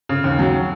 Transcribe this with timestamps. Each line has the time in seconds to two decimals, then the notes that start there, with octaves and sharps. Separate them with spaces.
0.09 C#3
0.24 D#2
0.39 F#3